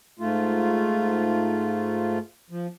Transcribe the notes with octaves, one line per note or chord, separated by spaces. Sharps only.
G#2 A3 F4
F3